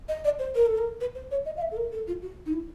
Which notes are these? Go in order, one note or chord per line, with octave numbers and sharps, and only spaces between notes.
D#5
D5
C5
A#4
A4
A#4
B4
C5
C#5
D#5
F5
E5
A4
A#4
A4
F4
F#4
D#4
E4